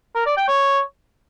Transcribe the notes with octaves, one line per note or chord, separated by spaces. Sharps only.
A#4
D5
G5
C#5